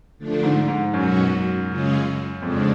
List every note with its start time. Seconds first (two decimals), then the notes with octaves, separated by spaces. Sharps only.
0.18 D3 F3 A3 D4
0.43 G#2
0.68 G#2
0.93 F#2 B2 F#3 C#4 F#4
1.68 C#3 G#3 C#4 F4 G#4
2.42 F2 C#3 F3 G#3 D4